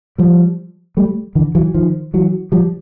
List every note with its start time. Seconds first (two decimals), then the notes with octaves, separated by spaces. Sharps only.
0.18 F3 G3
0.97 G3 A3
1.35 D3 E3
1.55 E3 F#3
1.74 D#3 F3
2.14 E3 F#3
2.52 F3 G3